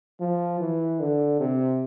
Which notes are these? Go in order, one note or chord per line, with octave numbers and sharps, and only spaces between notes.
F3
E3
D3
C3